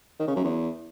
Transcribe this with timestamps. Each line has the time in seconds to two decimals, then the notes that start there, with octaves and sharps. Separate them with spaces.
0.19 D#3
0.27 C#3
0.36 F#2
0.44 E2